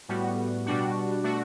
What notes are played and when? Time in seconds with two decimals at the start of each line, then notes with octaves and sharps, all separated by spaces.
0.08 A2 G3 B3 F#4
0.66 B2 G3 D4 F#4
1.24 B2 A3 D4 F#4